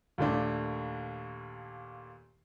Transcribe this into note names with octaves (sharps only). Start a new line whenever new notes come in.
D#2 A#2 A3 D4